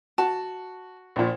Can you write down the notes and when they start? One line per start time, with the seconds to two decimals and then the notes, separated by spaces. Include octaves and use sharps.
0.18 F#4 A5
1.16 A#1 A#2